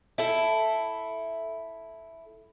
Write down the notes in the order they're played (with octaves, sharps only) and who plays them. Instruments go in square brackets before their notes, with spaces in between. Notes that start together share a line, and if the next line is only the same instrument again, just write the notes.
[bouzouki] E4 A4